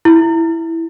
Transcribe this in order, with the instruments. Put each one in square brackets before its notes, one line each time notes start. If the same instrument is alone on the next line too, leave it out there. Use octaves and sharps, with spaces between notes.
[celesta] E4